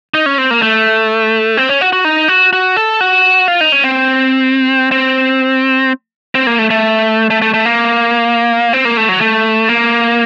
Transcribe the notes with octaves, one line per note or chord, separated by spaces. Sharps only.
D#4
C#4
C4
A#3
A3
C4
C#4
F#4
F#4
D#4
F#4
F#4
A4
F#4
F4
D#4
C#4
C4
C4
C4
A#3
A3
A3
A3
A3
A3
A#3
C4
A#3
A3
F#3
A3
A#3